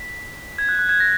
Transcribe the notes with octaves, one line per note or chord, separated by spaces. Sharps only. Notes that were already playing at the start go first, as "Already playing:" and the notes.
Already playing: B6
G#6
F#6
F#6
G#6
A#6